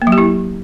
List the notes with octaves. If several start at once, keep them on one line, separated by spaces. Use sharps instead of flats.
A#3
F#3
G4
E4